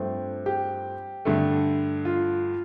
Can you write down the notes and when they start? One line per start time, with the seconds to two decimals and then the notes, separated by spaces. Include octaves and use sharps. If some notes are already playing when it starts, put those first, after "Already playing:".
Already playing: G2 F3 A3 C4
0.46 G4
1.25 G2 D3 A3
2.05 F4